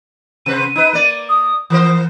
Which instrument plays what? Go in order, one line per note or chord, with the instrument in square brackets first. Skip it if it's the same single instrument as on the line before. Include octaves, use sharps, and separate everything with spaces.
[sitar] C3 B4 C5 [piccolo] D#7
[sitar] D#4 B4
A#3 D5
[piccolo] D#6
[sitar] E3 A#4 C5 [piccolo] D#6